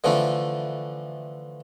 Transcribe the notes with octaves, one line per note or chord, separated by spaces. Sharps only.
D3 E3 F3 A3 D4